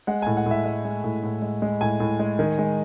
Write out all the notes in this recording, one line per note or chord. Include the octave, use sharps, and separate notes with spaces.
G#3 F#5
A2 G#5
F#5
A2 E5
G#3 E5
G#3
A2
A2
G#3
G#3
A2 G#5
A2
G#3
D#3
G#3